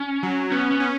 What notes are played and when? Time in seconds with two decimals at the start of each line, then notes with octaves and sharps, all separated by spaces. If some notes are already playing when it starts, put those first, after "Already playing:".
Already playing: C#4
0.23 F#3
0.51 B3 C#4
0.71 B3
0.80 C#4